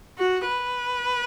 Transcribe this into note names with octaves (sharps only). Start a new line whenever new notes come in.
F#4
B4